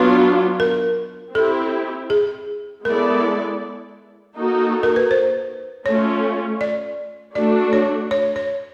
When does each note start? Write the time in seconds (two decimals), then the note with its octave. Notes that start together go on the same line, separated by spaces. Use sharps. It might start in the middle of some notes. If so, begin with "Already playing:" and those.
Already playing: F#3 B3 D4 F4 B4
0.60 A#4
1.35 C4 E4 G4 A4
2.10 G#4
2.85 G#3 B3 E4 A4 A#4 D5
4.35 A#3 D#4 F#4 A4
4.83 A#4
4.96 B4
5.11 C5
5.85 A3 C#4 F4 C#5
6.61 D5
7.35 A3 D4 F#4 D5
7.73 C#5
8.11 C#5
8.36 C#5